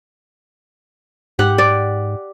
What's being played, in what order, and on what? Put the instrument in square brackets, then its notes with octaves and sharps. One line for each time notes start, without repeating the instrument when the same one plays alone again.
[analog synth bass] G#2 [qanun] G4 F#5
[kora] D5